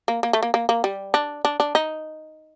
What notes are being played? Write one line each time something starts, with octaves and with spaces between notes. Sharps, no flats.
A#3
A#3
A3
A#3
A#3
A#3
G3
D4
D4
D4
D#4